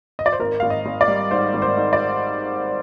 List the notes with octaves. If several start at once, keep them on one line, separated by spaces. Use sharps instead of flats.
D#5
D5
C5
G#1 A#4
G#1 F5
D#5
G#1
D5
G3
G#2 C5
G#1
C5
G#2
D5